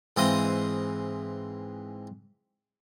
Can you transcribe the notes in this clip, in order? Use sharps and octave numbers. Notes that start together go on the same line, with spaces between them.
G#2 E3 C4 D#5 F5 D#6